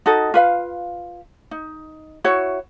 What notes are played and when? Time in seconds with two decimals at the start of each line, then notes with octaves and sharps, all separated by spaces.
0.06 D#4 F#4 A4 D#5
0.34 F4 B4 F5
1.51 D#4
2.24 E4 F#4 C#5